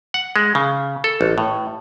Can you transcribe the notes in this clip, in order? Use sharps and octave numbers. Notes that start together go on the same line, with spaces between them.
F#5
G#3
C#3
A4
A1
A2